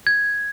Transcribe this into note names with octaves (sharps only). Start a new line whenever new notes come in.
G#6